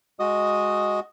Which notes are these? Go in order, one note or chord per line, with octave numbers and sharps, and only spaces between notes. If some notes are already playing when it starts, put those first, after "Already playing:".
G#3 F#4 D#5 D#6